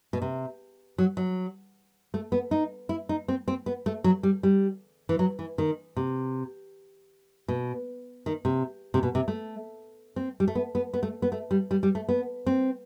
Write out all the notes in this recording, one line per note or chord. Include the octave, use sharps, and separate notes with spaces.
B2
C3
F#3
F#3
A3
B3
D#4
E4
D#4
C4
C4
B3
A3
F#3
G3
G3
E3
F#3
E3
D#3
C3
B2
D#3
C3
C3
B2
C3
A3
C4
G3
A3
B3
B3
B3
A3
B3
A3
G3
G3
G3
A3
B3
C4